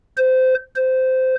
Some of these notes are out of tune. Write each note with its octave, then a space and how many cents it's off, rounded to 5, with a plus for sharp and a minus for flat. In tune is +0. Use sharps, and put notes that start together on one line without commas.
C5 -20
C5 -15